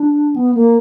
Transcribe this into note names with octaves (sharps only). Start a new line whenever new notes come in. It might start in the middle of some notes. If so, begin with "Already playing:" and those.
Already playing: D4
B3
A#3